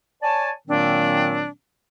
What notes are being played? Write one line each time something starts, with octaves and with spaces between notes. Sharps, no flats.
C#5 D5 G#5 A5
A#2 D#3 F#3 A#3 C4 D4